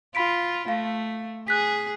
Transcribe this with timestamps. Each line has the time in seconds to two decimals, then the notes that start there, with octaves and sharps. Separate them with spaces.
0.15 F4 B5 B6 D7
0.68 A3 F5
1.48 G#4 F#6 B6